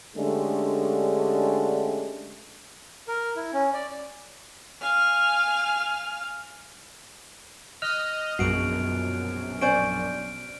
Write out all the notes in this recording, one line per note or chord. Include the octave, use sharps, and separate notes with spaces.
D3 G#3 A3 C#4 D4 G4
A#4
E4
C#4
D5
F5 G#5 F6
D#5 F6 F#6 F7
A#1 F#2 B2 G#3 F#4 C7 D7
C#4 C5 D5 D7